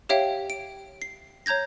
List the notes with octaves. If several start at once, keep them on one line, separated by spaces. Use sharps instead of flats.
G4 C#5 E5 F5 G5
D7
C7
C#5 A#5 G6 G#6 A#6